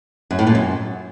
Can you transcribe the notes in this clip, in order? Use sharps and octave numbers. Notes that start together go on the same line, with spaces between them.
F#2
A2
A#2
F#2